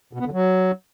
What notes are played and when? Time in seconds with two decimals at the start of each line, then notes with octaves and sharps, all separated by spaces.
0.13 B2
0.20 B3
0.26 D3
0.32 F#3